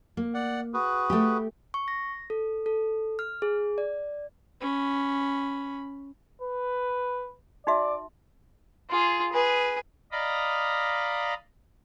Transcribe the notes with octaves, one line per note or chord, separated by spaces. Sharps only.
A#3
D5 F#5
F#4 G#4 B4
A3 G4
C#6
A#6
A4
A4
F6
G#4
D5
C#4 B5
B4
D#4 F#4 D5 E5
F4 G#4
G#4 B4
D5 D#5 F5 A#5 B5